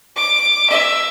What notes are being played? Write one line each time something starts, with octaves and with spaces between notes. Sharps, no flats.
D6
E5